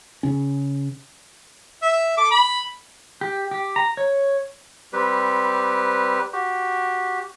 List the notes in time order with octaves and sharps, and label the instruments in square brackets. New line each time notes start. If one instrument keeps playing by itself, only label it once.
[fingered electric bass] C#3 C#4
[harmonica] E5
A4 D6
B5
[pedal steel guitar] G4
G4
A#5
C#5
[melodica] G3 C4 G4 B4
F#4 G4